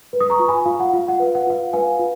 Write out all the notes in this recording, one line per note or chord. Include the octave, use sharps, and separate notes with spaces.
B4
D#6
A#5 C#6
F4
G#5 B5
F4 F5
F#5
F4 F5
F#5
B4 F5
F#5
F4 F5
B4 F5 G#5
F4